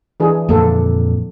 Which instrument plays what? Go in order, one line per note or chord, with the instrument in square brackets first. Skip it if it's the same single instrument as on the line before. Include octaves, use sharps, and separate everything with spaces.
[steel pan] E3 D4 G#4
[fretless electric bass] F2 A#2 D3 [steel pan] A#3 A4